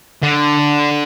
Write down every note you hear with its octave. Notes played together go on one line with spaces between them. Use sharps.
D3